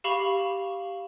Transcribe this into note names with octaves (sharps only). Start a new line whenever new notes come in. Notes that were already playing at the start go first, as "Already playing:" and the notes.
G4 F5 B5 C#6 F7